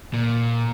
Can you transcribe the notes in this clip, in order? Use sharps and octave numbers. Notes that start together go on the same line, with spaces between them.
A#2